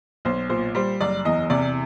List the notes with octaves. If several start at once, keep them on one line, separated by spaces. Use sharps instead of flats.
B1 C5
A#2 C5
G3 C5
F#1 D5
E2 D#5
C3 D5